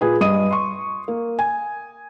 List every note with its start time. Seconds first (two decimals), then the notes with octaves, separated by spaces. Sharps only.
0.01 A#2 G#4 B4
0.21 G2 D#5 D#6 D#7
0.51 C6 C#6
1.08 A#3
1.39 G#5